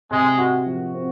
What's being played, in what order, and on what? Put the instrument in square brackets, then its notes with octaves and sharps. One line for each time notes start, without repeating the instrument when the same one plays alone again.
[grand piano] C3 [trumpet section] G#3
[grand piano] F#4
F3
C4